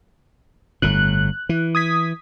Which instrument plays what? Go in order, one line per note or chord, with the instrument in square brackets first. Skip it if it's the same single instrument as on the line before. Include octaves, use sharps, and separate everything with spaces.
[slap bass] G1 A2 [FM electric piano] F#6
[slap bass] E3
[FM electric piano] D#6 G#6 B6